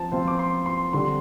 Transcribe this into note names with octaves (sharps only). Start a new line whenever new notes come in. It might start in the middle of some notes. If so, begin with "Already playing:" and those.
Already playing: F3 C4 F4 A5
F3 C4 F4 C5
D6
C6
C6
D3 G3 C4 C6